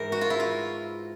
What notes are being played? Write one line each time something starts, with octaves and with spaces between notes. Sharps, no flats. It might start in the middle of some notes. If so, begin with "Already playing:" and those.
Already playing: G#2 E3 A#4
F#4
F4
E4
F4